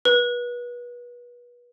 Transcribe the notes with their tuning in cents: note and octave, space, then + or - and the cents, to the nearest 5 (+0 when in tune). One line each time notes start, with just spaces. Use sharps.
B4 -30